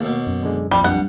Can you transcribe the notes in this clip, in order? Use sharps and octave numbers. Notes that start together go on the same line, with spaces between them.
D#2 B2 A#3
F#2
D3 G#3
A#1 F2 G3
G2 F#5